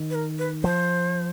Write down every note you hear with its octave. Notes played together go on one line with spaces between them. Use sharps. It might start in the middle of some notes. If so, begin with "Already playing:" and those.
Already playing: D#3
B4
A#4
B4
F3 C5